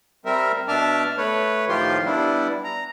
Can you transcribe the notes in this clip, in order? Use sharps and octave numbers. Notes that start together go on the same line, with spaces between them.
G3 C4 A#4 E5
B2 D4 E5 A5 D6 F6
A3 B4 C#5
A2 D#3 F3 F4 G4 C6
G3 B3 D4 E4
A#5